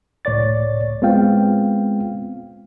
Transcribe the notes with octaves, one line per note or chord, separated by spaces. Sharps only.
C#2 A2 C#5 D5 A6
G#3 B3 C4 F4 F5 G5